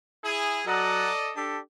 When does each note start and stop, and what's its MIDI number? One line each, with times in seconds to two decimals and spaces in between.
0.24 0.60 64
0.24 0.60 68
0.67 1.10 54
0.67 1.34 69
0.67 1.34 74
0.67 1.34 75
0.67 1.10 78
0.67 1.10 82
1.36 1.59 62
1.36 1.59 67
1.36 1.59 69